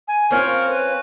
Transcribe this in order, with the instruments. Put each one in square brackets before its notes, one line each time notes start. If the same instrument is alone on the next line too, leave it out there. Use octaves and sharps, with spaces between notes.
[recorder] G#5
[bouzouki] C4 C#4 F4 [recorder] A#4
[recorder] B4